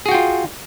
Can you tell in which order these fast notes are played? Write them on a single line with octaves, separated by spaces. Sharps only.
G#4 F#4 G5 F4